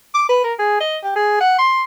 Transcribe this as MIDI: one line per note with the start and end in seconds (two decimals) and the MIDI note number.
0.14 0.28 86
0.29 0.40 71
0.44 0.53 70
0.59 0.79 68
0.80 0.97 75
1.03 1.12 67
1.16 1.38 68
1.41 1.54 78
1.58 1.83 84